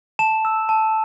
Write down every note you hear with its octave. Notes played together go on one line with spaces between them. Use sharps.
A5 E7
E6
A5